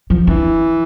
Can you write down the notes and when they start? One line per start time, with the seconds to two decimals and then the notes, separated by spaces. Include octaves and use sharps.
0.10 F3
0.27 E3 D4